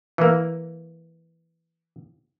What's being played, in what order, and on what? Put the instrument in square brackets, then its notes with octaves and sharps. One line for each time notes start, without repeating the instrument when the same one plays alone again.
[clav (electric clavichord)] E3 A#3